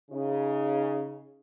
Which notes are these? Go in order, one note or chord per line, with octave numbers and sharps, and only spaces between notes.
C#3 D#4